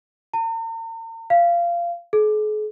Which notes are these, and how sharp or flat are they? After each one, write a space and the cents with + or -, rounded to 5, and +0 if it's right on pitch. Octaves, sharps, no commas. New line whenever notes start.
A#5 -45
F5 -20
G#4 +45